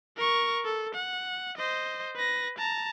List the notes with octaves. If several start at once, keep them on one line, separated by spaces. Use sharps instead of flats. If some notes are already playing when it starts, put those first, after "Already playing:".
A#4 C#6
A4
F#5
C5 D#5
B4 A#6
A5 A#5